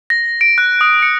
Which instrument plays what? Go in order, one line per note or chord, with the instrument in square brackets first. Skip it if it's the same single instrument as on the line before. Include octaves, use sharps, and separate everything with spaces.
[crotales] A#6
D7
F#6
D#6
C#7